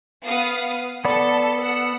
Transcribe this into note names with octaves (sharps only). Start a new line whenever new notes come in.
B3 F5 D#6
B3 A4 D5 B5
F#5 E6